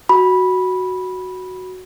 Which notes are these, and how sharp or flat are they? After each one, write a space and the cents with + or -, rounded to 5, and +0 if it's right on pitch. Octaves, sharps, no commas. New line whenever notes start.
F#4 +0 B5 -10